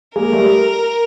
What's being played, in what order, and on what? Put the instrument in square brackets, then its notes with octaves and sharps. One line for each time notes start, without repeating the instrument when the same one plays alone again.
[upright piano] G#3 A#3 [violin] A#4
[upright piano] G3 A3